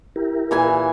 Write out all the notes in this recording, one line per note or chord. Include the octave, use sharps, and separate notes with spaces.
E4 G4 A#4
A#2 E3 G#5